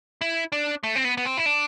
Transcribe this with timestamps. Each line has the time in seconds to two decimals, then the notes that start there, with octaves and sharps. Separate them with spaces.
0.21 E4
0.52 D4
0.83 A3
0.95 C4
1.05 B3
1.17 B3
1.26 C4
1.37 E4
1.46 D4